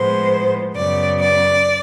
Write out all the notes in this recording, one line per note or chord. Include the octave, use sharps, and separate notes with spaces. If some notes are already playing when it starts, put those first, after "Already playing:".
Already playing: A2 F3 G#3 B3 C5
F#2 C#3 F#3 B3 D5
D5